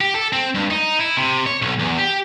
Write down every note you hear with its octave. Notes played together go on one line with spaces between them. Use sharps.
G4
A4
C4
G2
D#4
E4
C3
C#5
B1
E2
G4